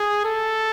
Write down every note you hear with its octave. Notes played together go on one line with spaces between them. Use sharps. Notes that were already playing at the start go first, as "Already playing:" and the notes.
Already playing: G#4
A4